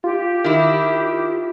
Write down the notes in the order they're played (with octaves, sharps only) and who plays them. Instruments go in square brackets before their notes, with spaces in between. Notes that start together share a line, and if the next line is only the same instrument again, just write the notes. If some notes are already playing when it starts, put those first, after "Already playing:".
[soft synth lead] F4 [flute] G4
[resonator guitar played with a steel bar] D#3 E4